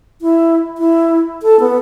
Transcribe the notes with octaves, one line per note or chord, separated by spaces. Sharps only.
E4
E4
A4
B3